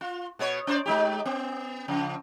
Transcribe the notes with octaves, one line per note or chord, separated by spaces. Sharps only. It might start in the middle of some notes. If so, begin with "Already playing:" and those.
F4
B2 B3 C#5
C#4 C5 D5
G#3 D#4 G4
B3
C#3 F3